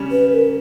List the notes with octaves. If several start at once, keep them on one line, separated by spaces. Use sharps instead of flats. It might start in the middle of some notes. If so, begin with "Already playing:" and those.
Already playing: C#3 G3 C#4
B4
A#4